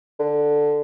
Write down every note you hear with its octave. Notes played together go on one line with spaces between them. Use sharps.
D3